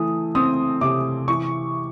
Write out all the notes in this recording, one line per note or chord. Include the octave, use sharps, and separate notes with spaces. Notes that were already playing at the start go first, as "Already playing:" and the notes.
Already playing: E3 A3 D#6
C4 D#6
C3 D6
E3 C#6